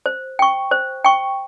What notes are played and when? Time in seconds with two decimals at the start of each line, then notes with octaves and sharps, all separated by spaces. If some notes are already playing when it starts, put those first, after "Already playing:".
0.06 C5
0.39 G5 C#6
0.71 C5
1.04 G5 C#6